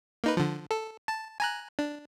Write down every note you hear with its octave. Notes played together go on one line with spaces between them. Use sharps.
A#3 D#4 B4
D3 F3
A4
A5
G#5 A#5 F#6
D4